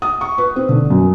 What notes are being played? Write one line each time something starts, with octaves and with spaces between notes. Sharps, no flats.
D#6
C#6
B4
C4
D3
F#2